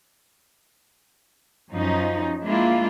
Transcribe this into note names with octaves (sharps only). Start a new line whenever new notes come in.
F#2 F3 C#4 D#4
G#3 A#3 D4 E4 F4